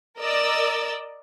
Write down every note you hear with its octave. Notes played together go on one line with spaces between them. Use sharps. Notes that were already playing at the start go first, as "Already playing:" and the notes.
A#4 D5 D#5 E6